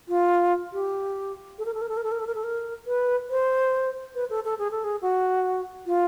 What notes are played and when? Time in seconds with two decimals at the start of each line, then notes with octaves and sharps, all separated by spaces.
0.08 F4
0.73 G4
1.58 A4
1.65 A#4
1.74 A4
1.81 A#4
1.89 A4
1.97 A#4
2.04 A4
2.11 A#4
2.19 A4
2.27 A#4
2.35 A4
2.43 A#4
2.86 B4
3.30 C5
4.15 B4
4.30 A4
4.44 A4
4.59 G#4
4.71 A4
4.84 G#4
5.02 F#4
5.86 F4